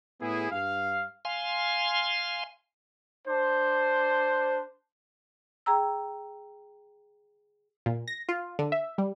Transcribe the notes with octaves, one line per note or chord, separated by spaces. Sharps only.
A2 B3 E4 G#4
G2 F5
F5 G#5 C6
D4 C5
G#4 G5 A#5 E6
A#2
A#6
F4
D3
E5
G3